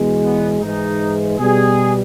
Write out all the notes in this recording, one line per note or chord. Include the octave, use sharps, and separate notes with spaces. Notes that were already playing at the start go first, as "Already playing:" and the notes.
Already playing: E2 B2 G#3
B3
G#2 E3 G#3 D#4
B2 G3 G#4